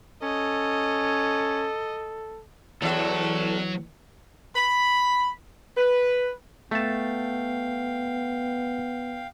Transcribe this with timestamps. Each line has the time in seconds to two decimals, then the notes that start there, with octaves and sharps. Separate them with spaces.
0.23 C#4 A4 D#5
2.82 E2 E3 F#3 A4 E5
4.55 B5
5.77 B4
6.71 A3 B3 F5 G5 A5